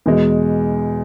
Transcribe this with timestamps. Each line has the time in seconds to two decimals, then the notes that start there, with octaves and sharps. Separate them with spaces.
0.06 E2 B2 G#3